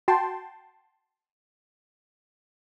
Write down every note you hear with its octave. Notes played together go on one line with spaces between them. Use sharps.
F#4 G5 A5 C6